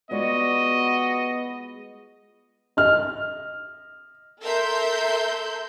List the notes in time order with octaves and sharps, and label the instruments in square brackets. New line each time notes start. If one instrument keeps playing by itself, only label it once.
[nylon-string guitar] G#3 F4 D5 [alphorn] B3 [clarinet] F#4 [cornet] D#5
[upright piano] D#5 F6
[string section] A4 A#4 E5 C6 G6